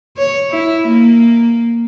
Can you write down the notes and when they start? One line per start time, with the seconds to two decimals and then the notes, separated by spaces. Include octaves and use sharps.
0.17 C#5
0.50 E4
0.88 A#3